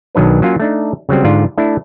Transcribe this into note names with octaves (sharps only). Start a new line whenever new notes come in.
B1 D#3 F#3 D4 B4
F#3 A#3 C#4 F4
A3 D4 D#4
C#3 F#3 G3 C4
G#2 D3 F4 D5
A3 D4 E4